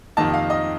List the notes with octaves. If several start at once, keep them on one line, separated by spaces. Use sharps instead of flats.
F2 C3 D#3 A#3 D#4 A5
F5
D#5